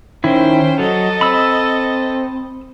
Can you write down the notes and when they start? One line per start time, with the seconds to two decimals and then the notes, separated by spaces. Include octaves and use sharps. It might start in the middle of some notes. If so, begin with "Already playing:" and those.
0.24 D#3 C#4 E4 C5 G5
0.80 F#3 A4 D#5
1.21 C4 B5 E6